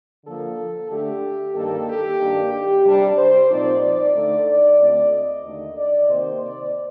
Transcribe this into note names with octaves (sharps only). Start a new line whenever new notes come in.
D3 F3 A#3 A4
D3 A3 D4 G4
G2 D#3 A#3 A4
G4
G2 D#3 A#3 D4
G4
C3 G3 D4
C5
A#2 F3 C4 D#4 D5
D5
D3 A3 D#4
D5
D2 D3 A3 C4 D5
D#5
D#2 D3 A3 D#4
D5
C3 D#3 A#3 D#4 C5
D5